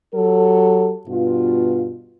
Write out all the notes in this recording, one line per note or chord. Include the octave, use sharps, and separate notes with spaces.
F#3 G4 A4
G2 B2 F4